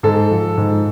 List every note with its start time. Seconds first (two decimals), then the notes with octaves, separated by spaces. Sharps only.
0.03 G#2 A4
0.31 F3
0.57 G#2